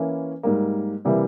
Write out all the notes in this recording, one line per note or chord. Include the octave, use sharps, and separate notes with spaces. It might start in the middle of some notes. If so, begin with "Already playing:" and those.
Already playing: E3 A#3 C#4 E4
G#2 G3 A#3
C3 E3 G3 A#3